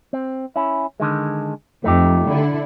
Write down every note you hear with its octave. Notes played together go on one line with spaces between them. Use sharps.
C4
C#4 E4
D3 D#3 G#3
F2 A3 D#4 G4
D3 E4